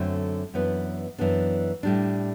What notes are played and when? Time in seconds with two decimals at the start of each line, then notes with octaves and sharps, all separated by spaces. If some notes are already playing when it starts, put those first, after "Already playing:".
Already playing: F#2 D3 A3 C4
0.54 F#2 E3 B3 D4
1.18 F#2 E3 B3 D4
1.83 A2 G3 D4